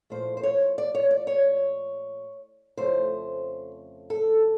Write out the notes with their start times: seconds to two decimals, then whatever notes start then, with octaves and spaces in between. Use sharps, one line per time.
0.10 A#2 F3 A3 C5
0.37 C5
0.43 C#5
0.78 D5
0.95 C#5
1.11 D5
1.27 C#5
2.77 F2 C#3 F3 A3 C5
4.10 A4